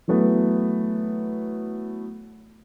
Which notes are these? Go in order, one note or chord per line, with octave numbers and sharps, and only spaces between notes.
E3 F#3 A3 B3